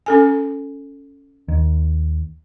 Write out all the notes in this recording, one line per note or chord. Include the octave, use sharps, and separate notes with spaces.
C#4 A4 G#5
D#2